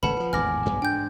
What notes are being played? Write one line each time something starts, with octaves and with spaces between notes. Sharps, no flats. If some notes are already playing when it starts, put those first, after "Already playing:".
G#1 C#3 A3 B4 F#5 A5 B5
E3 F3
G#1 E2 A2 G#5 D6 F6 A#6
B1 G2 B3
G#2 D4 G5 G6